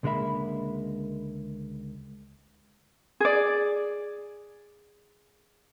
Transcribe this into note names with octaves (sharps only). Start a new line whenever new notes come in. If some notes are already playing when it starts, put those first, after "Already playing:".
C#2 D3 G#3 A#3 E5 B5
G#4 D5